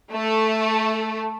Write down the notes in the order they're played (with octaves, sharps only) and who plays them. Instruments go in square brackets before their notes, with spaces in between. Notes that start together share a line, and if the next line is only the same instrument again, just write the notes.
[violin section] A3